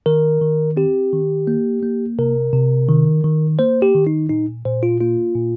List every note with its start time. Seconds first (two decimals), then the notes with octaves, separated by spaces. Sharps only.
0.06 D#3 A#4
0.42 D#3
0.77 C4 G4
1.13 D#3
1.47 A#3
1.82 A#3
2.19 C3 A#4
2.53 C3
2.89 D#3
3.24 D#3
3.59 A#3 C5
3.82 G4
3.95 D#3
4.07 D#4
4.29 A#2 D#4
4.65 A#2 C5
4.83 F4
5.00 A#3 F4
5.35 A#2